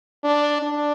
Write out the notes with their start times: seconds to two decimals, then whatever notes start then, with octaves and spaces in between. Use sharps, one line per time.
0.23 D4
0.62 D4